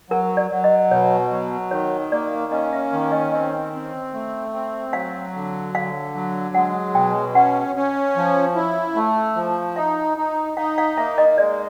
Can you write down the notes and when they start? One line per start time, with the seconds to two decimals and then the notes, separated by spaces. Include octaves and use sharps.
0.10 F#3 A#4
0.37 D5
0.51 F#3
0.64 D#5
0.91 B2 C#5
1.31 F#3
1.71 D#3 C#5
2.12 A#3 D5
2.52 C#4 D#5
2.73 E5
2.93 D#3
3.12 D#5
3.32 C4 D#5
3.73 C4
4.14 A3
4.54 C4
4.93 F#3 F5
5.34 D3
5.75 D3 F5
6.15 F#3
6.55 G#3 F#5
6.94 B2 G5
7.35 C#4 F#5
7.76 C#4
8.16 F3
8.55 E4
8.96 A3 F5
9.36 F3
9.76 D#4 E5
10.18 D#4
10.57 D#4 F5
10.78 F5
10.98 A#3 E5
11.18 D#5
11.38 G#3 D5